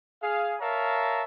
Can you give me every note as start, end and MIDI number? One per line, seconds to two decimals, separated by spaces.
0.23 0.55 68
0.23 0.55 77
0.60 1.23 70
0.60 1.23 73
0.60 1.23 76
0.60 1.23 77
0.60 1.23 81
0.60 1.23 82